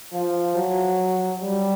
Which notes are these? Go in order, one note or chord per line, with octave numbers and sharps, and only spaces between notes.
F3
F#3
G3